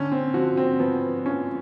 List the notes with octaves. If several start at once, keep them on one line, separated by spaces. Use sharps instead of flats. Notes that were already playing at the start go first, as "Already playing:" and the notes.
Already playing: D3 C#4
C4
F3 F#4
C4
F3 B3
F3 C#4